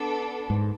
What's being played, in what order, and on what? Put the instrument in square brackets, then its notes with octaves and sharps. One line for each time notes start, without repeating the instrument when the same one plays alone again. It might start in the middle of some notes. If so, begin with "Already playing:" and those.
Already playing: [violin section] B3 D4 A4
[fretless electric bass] G#2